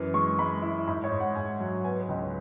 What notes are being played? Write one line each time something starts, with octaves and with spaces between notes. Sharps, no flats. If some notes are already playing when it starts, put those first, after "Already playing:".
Already playing: F#2 E3
G#3 C#6
G#3 B5
E4
G#2 B5
C#5
G#2
F#5
G#2 G#5
F#3
B3 G#5
B4
C#2
C#5